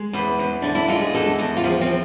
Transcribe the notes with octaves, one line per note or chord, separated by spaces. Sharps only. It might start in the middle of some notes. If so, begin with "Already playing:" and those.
Already playing: G#3
E2 B4
E2
D3 D4
E4
G#3 F4
G#4
E2 A4
E2
F4
F3 G#4
C4